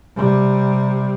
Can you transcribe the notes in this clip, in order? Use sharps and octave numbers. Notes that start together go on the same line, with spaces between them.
C3 G3